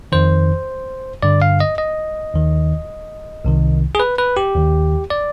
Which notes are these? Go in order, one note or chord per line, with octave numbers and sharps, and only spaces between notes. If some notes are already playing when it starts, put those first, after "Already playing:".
F2 D#3 C5
G2 D3 D5
F5
D#5
D#5
D#2 D#3
C2 C3 D#3
G#4
B4
B4
G4
D#2 D#3
D5